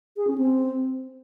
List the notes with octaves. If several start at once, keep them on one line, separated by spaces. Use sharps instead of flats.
G#4
C#4
C4